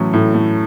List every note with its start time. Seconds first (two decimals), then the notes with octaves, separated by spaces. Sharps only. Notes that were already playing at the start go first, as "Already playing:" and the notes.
Already playing: A2 E3 F#3 A3 C#4
0.13 A2
0.34 A3